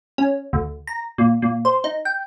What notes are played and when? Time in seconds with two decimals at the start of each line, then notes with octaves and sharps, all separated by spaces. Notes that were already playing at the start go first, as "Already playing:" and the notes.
0.18 C#4
0.53 D2
0.87 A#5
1.18 A#2
1.42 A#2
1.65 C5
1.84 D#4
2.05 G5